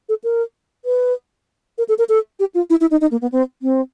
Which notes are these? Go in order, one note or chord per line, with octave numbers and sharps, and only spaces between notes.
A4
A#4
B4
A#4
A4
A#4
A4
G4
F4
E4
E4
D#4
D#4
A#3
B3
C4
C4